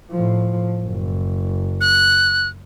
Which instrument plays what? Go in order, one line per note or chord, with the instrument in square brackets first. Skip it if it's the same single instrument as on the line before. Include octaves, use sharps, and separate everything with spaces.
[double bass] A2 F3
F#1
[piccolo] F#6